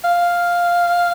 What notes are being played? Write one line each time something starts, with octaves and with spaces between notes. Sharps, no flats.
F5